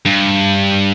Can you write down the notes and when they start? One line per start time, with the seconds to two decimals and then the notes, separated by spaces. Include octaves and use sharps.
0.06 G2